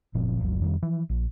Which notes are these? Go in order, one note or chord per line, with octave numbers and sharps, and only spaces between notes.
F#1 A#2 F3 C4
G1 D2 C3 F#3
F2 D#3 F3 G3
E3 F3
A#1